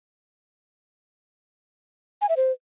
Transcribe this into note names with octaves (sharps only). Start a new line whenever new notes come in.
G#5
E5
C5